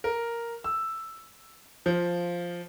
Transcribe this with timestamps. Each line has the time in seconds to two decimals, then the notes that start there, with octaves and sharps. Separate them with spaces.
0.04 A#4
0.64 E6
1.86 F3